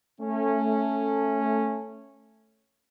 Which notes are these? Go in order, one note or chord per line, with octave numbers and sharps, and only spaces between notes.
A3 C#4